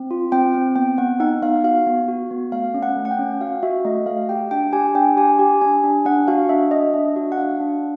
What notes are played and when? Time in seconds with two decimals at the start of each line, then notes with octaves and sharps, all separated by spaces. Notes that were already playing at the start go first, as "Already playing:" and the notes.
Already playing: C4
0.11 F4
0.32 C4 G5
0.54 C4
0.76 B3 G5
0.98 B3 F#5
1.20 D#4 F#5
1.42 B3 F5
1.64 F#4 F5
1.87 B3
2.08 F#4
2.31 B3
2.52 A3 F5
2.74 C#4
2.83 F#5
2.96 A3
3.05 F#5
3.11 G5
3.19 C#4
3.41 F#4 F5
3.63 F#4 E5
3.85 A3 D#5
4.06 A3 F5
4.29 G4 G5
4.51 D4 G5
4.73 G4 G#5
4.95 D4 G5
5.17 G4 G#5
5.39 G4
5.61 D4 G#5
5.84 D4
6.05 D4 F#5
6.28 F#4 F5
6.49 D4 E5
6.71 D4 D#5
6.94 D4 E5
7.16 F#4
7.32 F#5
7.38 D4 F5
7.60 D4